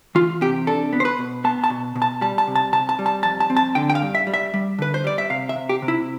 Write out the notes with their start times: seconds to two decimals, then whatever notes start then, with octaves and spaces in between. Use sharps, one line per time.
0.15 E3 F4
0.41 C3 G4
0.67 D4 A4
0.93 B3
1.00 C5
1.05 B4
1.19 B2
1.44 B3 A5
1.64 A5
1.70 B2
1.96 B2
2.02 A5
2.21 G3 A5
2.38 A5
2.47 C3
2.55 A5
2.73 C3 A5
2.89 A5
2.99 G3
3.06 A5
3.23 F2 A5
3.40 A5
3.50 C4
3.57 A5
3.75 D3 G5
3.90 G5
3.95 F5
4.02 G2
4.15 E5
4.27 G3
4.34 E5
4.54 G3
4.79 D3 B4
4.94 C5
5.04 G3 D5
5.18 E5
5.30 C3 F5
5.49 E5
5.56 C3
5.69 G4
5.82 C3
5.88 E4